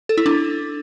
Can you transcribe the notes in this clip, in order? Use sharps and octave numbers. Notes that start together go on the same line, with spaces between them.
A4
E4
D4